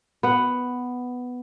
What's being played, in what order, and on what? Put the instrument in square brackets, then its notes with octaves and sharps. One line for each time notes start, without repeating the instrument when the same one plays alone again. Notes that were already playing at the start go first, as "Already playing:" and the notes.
[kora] B3 F#5